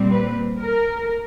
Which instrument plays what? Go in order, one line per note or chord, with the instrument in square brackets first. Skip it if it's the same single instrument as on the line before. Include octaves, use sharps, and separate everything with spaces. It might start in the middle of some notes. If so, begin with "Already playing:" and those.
Already playing: [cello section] A#2 G3 C4
B4
A#4